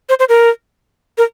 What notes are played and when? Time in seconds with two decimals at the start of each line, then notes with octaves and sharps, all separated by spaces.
0.09 C5
0.19 C5
0.29 A#4
1.18 A#4